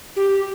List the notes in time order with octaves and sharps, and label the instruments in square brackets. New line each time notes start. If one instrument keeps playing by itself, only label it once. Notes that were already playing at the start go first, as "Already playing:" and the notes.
[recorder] G4